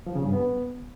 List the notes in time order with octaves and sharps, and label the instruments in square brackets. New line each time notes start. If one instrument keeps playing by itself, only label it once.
[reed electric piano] F3
C#3
G2
B3